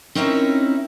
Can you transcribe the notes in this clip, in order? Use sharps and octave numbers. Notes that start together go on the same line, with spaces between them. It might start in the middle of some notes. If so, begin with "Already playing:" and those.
C4 C#4 D#4 E4 A#4 C#5